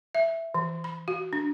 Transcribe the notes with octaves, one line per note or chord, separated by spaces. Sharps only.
E5
E3
B5
F#4
D4